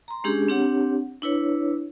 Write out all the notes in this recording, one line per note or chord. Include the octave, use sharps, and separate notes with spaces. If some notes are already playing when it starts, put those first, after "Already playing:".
A#5 C6
G#3 C#4 D4 G4 G#4
C4 D4 G4 C#5 F#5
D4 E4 B4 C#5